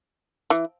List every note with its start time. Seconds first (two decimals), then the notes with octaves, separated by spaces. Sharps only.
0.50 E3